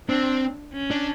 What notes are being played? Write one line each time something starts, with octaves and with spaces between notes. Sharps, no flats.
C4 D4
C#4
D4